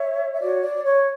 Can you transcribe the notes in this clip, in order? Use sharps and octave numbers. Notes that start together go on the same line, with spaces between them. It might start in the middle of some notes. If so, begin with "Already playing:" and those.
Already playing: C#5 E5
E5
F#4 C#5 D5
D5
C#5